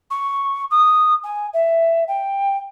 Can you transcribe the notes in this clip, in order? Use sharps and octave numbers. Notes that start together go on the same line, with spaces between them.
C#6
D#6
G#5
E5
G5